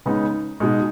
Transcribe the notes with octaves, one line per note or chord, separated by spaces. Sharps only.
C#3 G#3 B3 D#4
B2 G#3 D#4